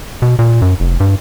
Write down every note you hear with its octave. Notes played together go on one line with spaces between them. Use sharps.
B2
A#2
F#2
F1
G2